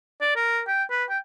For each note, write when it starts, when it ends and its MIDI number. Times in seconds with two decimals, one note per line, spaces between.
0.21 0.34 74
0.36 0.60 70
0.68 0.84 79
0.90 1.04 71
1.09 1.18 79